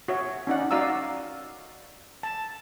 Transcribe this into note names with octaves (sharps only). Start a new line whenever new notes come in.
F#4 C#5 E5
C#4 D#4 D5 F#5
D#4 F#4 D5 F5 A#5 E6
A5